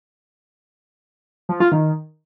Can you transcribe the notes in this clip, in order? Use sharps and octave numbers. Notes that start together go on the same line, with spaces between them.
F3
F4
D#3